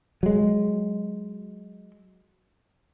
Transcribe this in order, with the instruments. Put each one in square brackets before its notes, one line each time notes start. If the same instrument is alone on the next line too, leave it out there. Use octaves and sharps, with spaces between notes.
[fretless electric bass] F#3 G#3